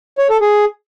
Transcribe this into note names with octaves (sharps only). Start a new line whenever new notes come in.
C#5
A4
G#4